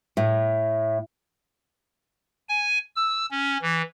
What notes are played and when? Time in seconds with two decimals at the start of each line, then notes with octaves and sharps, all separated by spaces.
0.17 A2
2.49 G#5
2.96 E6
3.31 C#4
3.62 E3